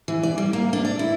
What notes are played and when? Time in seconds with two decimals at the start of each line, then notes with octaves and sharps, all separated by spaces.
0.08 E3
0.23 D5
0.38 G3
0.53 A#3
0.73 D4
0.85 D5
0.99 E4